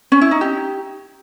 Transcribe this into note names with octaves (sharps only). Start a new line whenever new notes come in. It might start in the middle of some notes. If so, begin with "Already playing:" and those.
C#4
E4
D#4
G4